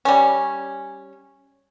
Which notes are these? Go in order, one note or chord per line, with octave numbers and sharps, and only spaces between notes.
G3 C#4